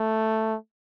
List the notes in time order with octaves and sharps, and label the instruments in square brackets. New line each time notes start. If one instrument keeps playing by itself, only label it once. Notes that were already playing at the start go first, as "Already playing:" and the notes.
Already playing: [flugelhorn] A3